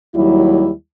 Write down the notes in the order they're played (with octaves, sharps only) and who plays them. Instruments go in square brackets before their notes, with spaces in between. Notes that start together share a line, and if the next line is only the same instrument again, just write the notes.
[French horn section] D#2 F#3 G3 E4